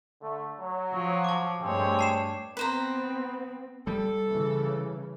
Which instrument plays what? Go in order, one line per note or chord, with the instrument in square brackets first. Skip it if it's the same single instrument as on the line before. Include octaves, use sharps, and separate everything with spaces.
[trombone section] D3 A3
F#3
[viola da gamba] F3
[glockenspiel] A5 D6
[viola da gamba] G2 A3 C#5 [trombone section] G#3 C4 G4
[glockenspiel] A5 C7 E7
[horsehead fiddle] B3 C4 [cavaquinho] B4 C5 A#5
[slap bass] G3 [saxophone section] A4
[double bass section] C#3 E3